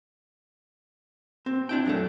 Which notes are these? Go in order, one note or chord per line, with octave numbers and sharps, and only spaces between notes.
C4
D4 E4 G5
F#2 F#3 A3